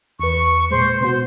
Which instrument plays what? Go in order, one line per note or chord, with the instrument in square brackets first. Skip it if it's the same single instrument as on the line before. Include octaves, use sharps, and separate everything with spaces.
[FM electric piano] E2 B4 [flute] C#6
[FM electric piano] A#2 G#3 [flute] C5
[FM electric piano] B2 B3 F#4 [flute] C5